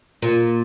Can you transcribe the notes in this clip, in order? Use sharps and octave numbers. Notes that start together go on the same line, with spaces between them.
A#2